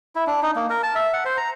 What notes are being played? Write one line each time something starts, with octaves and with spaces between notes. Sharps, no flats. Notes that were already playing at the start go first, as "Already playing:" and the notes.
E4
D4
D#4
A#3
A#4
A5
E5
F#5
C5
A#5